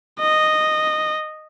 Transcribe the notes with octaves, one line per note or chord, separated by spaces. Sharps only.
D#5